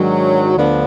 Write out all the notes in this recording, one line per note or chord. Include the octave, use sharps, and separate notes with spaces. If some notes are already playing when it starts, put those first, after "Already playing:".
Already playing: G#2 D#3 F#3 D4
D2 D3 F3 B3 D4